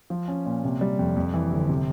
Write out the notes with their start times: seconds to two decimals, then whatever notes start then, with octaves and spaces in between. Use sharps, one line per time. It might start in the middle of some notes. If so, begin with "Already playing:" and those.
0.10 F3
0.28 C#4
0.45 A#2
0.64 C3
0.81 G3
0.99 F2
1.16 F2
1.34 E3
1.52 G1
1.69 C3